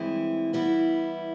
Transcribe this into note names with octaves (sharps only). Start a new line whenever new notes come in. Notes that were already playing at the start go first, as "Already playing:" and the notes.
Already playing: G2 E3 G#3 C4 E4
E3 G3 B3 E4